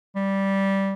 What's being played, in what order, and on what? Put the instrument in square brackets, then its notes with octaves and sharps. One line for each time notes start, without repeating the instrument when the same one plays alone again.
[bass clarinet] G3